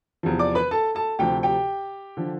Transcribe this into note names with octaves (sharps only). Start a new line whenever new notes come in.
E2 C3 F3
D5 D6
B4 B5
A4 A5
A4 A5
D2 C3 F3 G4 G5
G4 G5
D3 F3